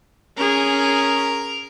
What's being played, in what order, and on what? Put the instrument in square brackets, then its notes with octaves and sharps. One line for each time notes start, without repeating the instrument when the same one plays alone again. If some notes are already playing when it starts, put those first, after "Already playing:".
[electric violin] C#4 G#4 [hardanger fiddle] A#4